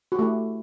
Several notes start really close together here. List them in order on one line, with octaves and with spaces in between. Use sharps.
F#4 G4 A3 E4